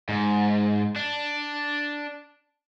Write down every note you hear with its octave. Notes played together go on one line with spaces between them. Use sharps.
G#2
D4